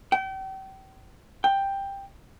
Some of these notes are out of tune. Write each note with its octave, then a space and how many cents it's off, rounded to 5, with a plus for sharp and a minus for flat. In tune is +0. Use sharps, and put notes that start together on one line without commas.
G5 -35
G5 +10